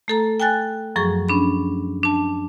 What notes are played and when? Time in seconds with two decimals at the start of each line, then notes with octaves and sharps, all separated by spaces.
0.08 A3 A4 A#5
0.40 G5 G#5 F#6 A6
0.96 F#2 F3 F#3 G#4 C#6
1.29 C#4 D4 B5
2.03 D4 A5